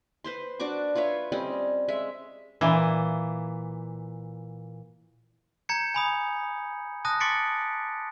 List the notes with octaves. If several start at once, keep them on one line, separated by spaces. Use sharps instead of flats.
B4 C5 C6
D4 F#4 C#6 D6
F4 B4 C#5 E5
G3 C4 C#4 D#5
G#3 E5
A#2 E3
A#5 G6 G#6 C#7
G#5 B5 D#6
A5 D#6 F#6 A#6
C6 D6 A6 B6 C#7 D7